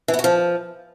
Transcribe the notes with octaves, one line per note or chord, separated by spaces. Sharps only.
E3
B3
F#4
F3